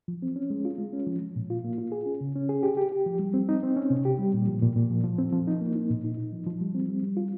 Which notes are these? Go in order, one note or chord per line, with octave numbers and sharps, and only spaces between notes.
F3
C4
C#4
G#3
F4
G#3
C#4
F3
F3
A#2
F4
A#3
F4
G#4
C#4
C#3
C#4
G#4
G4
G4
G4
F3
G3
C4
D#4
C4
C#4
C3
G4
G3
A#2
F3
A#2
A#2
F3
F3
C4
F3
D#4
A#3
D#4
A#2
D#4
D#4
F3
F3
G3
C4
G3
G3
F4